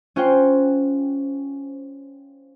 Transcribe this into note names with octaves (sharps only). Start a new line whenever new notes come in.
C#4 F4 C5 F#5 G5 C6